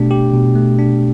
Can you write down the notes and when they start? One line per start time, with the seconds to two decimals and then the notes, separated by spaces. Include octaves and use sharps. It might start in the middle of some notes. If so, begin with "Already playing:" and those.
Already playing: B2 A3 D4 G4
0.11 G4
0.34 B2
0.55 A3
0.79 D4